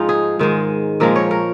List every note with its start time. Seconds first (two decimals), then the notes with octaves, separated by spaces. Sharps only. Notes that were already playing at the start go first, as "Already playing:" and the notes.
Already playing: G#2 F3 G#3 D#4 F4
0.09 G#4
0.39 G#2 D#3 G#3
1.00 A#2 F3 G#3 A#4
1.16 C#5
1.31 A#4